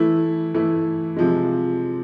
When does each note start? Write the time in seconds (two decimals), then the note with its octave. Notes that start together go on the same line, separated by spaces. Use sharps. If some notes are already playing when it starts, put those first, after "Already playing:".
Already playing: E3 A3 E4
0.54 E3 A3 E4
1.16 C3 F3 G#3